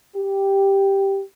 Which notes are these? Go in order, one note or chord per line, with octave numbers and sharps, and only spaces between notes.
G4